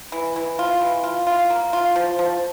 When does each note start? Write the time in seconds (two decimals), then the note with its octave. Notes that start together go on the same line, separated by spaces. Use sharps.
0.12 E3
0.36 E3
0.59 F4
0.81 E3
1.04 F4
1.27 F4
1.50 A#3
1.73 F4
1.96 F3
2.19 F3